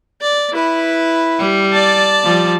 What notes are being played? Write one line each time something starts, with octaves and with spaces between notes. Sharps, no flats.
D5
E4 B4
G3
D5 A5
F3 G3